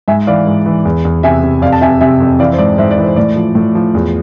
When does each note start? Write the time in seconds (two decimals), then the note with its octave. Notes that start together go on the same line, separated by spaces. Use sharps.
0.08 G#2 E5 G#5
0.27 E3 D5 F5
0.47 G#2
0.66 E3
0.85 E2
1.05 E2
1.23 C3 E5 G#5
1.43 C3
1.62 F2 D5 F5
1.73 A5
1.81 C3 E5 G#5
2.01 C3 E5 G#5
2.20 F2
2.39 E3 D5 F5
2.53 C5
2.59 G#2 D5
2.78 G#2 C5 E5
2.91 D5
2.98 E3
3.04 C5
3.16 A2 D5
3.36 F3
3.55 A2
3.75 F3
3.95 E2